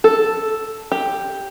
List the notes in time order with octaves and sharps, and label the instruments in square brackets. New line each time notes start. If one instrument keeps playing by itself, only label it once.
[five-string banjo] A4
G4